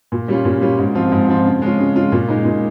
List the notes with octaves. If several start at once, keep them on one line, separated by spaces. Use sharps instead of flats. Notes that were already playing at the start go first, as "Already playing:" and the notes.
A#2
G3 C#4 F4
A#2
G3 C#4 F4
G#2
F3 C4 F4
G#2
F3 C4 F4
C#3
G#3 C#4 F4
C#3
G#3 C#4 F4
A#2
G#3 D#4
A#2